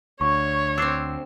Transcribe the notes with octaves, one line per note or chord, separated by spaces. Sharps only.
D2 C#5 C#6
C4 D4 E6 C7